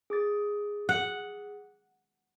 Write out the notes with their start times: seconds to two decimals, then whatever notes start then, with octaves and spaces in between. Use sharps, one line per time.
0.10 G#4 D6 A6
0.89 F#5